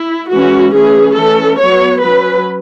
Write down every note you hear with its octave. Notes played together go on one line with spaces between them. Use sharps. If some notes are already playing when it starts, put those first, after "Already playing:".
Already playing: E4
E3 G#3 C#4 F#4
E3 A3 C#4 G#4
E3 A3 C#4 A4
F#3 B3 C#5
F#3 C#4 B4